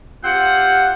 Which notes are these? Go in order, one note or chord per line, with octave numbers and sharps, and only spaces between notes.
C4 F4 G4 F#5